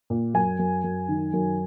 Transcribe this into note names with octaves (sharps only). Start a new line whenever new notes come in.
A#2
F#2 G#5
F#2
F#2
D#3
F#2